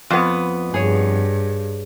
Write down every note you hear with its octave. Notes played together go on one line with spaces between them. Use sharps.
F2 B3
G2 G#4 C#5